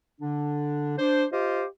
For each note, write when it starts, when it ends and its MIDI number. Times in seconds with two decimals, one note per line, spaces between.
0.20 0.93 50
0.20 0.93 62
0.98 1.26 62
0.98 1.26 72
1.32 1.64 65
1.32 1.64 67
1.32 1.64 72
1.32 1.64 75